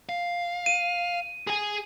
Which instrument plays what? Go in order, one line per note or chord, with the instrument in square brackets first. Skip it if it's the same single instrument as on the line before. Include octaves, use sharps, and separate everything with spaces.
[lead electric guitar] F5
[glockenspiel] D#7
[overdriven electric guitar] G#4 G#5